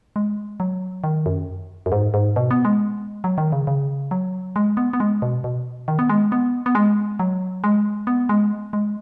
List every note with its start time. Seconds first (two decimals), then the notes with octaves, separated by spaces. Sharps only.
0.16 G#3
0.60 F#3
1.04 D#3
1.26 F#2
1.86 F#2
1.92 G#2
2.14 G#2
2.36 B2
2.51 B3
2.65 G#3
3.24 F#3
3.38 D#3
3.52 C#3
3.67 C#3
4.11 F#3
4.56 G#3
4.77 B3
4.93 B3
5.00 G#3
5.22 B2
5.44 B2
5.88 D#3
5.99 B3
6.09 G#3
6.32 B3
6.66 B3
6.75 G#3
7.19 F#3
7.64 G#3
8.07 B3
8.29 G#3
8.73 G#3